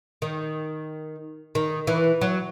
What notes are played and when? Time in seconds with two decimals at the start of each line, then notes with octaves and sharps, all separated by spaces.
0.22 D#3
1.55 D#3
1.87 E3
2.21 F#3